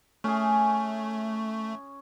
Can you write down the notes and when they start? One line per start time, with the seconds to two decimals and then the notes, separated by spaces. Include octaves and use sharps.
0.24 A3 C#4 G#4